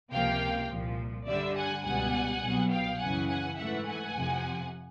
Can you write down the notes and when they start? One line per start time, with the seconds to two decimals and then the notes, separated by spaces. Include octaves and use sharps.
0.12 C#2 C3 F3 A#3 F5 G5
0.70 C2 A#2 F3
1.27 G2 D3 G3 D5 E5
1.56 F#5 G#5
1.84 C#2 B2 G3 B3 F#5 G#5
2.42 C2 B2 F#3 B3
2.71 F5 G5
2.99 F#2 C#3 E3 F#5 G#5
3.29 F#5 G#5
3.58 G#2 E3 A3 E5 F#5
3.87 F#5 G#5
4.15 F2 C3 F3